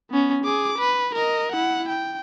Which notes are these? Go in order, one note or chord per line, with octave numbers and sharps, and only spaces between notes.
B3 C#4
G#4 D6
B4
A#4 D#5
E4 F#5
G5